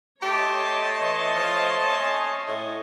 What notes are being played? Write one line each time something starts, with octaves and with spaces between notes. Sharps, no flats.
A3 G4 C#5 D#5 A5 C6
E3
F3
C#4
A2